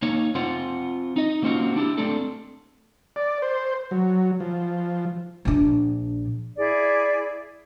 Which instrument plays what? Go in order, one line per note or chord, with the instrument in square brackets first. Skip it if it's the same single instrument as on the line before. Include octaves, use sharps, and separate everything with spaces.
[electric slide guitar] A#3 D#4 C#5
C4 F4 C5 F#5
D#4 D#5
F#3 A#3 C4 C#4 F4 F#4
D4 E4 G4
A3 C4 D4 A4
[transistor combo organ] D5
C5
F#3
F3
[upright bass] A#1 D4
[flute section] E4 G#4 D5